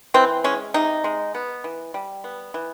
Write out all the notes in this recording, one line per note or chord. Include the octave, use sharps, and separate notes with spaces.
E3 C4
G#3 C#4
C3 D#4
G#3
B3
E3
G3
B3
E3